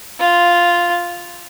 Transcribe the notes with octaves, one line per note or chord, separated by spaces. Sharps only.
F4